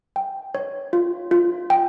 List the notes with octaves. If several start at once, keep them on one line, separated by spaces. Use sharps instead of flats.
G5
C#5
F4
F4
G5